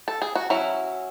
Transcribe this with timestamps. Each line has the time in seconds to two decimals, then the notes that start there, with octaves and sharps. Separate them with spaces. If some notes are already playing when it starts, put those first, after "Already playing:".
0.08 A4
0.22 G#4
0.35 F#4
0.50 F#3 C#4 E4